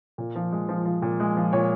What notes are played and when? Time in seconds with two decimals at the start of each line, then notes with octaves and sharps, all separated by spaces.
0.18 A#2
0.35 F3
0.52 G#3
0.69 F3
0.85 F3
1.02 A#2
1.20 G#3
1.37 F3
1.53 A#2 C#5